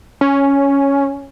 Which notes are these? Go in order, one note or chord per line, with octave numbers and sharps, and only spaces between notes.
C#4